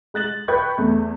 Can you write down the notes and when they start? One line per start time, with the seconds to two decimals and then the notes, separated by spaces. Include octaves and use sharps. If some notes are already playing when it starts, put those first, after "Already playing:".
0.14 G#3 F#6 A6 F#7
0.48 B4 G5 B5 C#6 G6 G#6
0.78 E2 A3